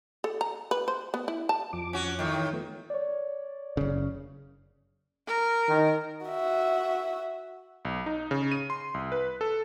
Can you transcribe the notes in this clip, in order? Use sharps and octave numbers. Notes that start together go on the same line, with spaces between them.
A4
A#5
B4
C5
B3
E4
A5
F2 F3 D6
C#4 F#4
A2 D#3
E3
F3 A3 B3
C#5 D5
F#1 C#3
A#4
D#3 D#4
F#4 E5
B1
D#4
C#3
D#7
C6
C2
B4
A4